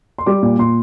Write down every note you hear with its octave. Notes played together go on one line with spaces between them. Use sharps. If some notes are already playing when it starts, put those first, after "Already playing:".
C6
G3 D6
A#2
A#2 C6